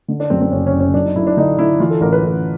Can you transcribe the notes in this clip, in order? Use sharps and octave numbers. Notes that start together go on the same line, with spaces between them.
D3
D4
F#2 C4
C4
F#1 C#4
C#4
F#1
C#4
F#2 D4
D#4
F#2 E4
D4
D3 D#4
D3 E4
E3 F4
A4
A1 A#4
B4
A1